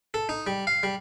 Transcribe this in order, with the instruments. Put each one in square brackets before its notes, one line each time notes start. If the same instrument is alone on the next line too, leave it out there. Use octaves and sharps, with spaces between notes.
[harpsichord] A4
D#4
G3
F5
G3